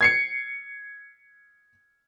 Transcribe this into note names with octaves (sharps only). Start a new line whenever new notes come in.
G#6 C7 C#7